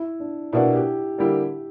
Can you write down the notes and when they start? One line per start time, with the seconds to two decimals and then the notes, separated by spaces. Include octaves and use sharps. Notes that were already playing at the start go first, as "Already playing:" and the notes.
Already playing: E4
0.20 D4
0.53 B2 A#3 D4 E4 F#4
0.75 G4
1.18 D3 G3 A#3 E4 G4